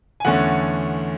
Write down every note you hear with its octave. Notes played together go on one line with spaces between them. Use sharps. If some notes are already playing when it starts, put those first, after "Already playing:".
G#5
E2 D3 A3 C#4 F#5